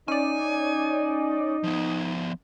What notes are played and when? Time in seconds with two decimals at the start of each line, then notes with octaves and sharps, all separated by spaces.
0.08 C#4 D#4 D5 G#5
1.63 F3 B3